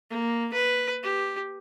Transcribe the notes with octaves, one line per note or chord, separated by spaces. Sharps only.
A#3
B4
G4